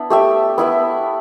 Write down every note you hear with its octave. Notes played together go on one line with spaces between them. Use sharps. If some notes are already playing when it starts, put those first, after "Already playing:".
Already playing: B3 D4 E4
A3 G4 E5
B3 E4 B4 E5